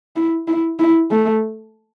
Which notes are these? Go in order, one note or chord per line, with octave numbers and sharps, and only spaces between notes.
E4
E4
E4
A3